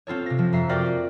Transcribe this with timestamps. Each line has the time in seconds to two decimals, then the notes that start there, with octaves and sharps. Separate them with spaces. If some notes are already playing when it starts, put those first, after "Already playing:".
0.07 C4 F4 A4 C#5
0.26 C3 A#6
0.39 F3
0.53 F2 E5 A#5 C7
0.69 F4 F#4 A#4 D5 G5
0.86 A#3